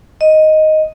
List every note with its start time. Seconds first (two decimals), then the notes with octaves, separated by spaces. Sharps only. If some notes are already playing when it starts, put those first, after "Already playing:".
0.21 D#5